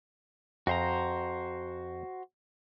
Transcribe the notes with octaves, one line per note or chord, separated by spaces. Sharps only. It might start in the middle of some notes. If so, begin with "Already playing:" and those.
F2 F#4 C5 A#5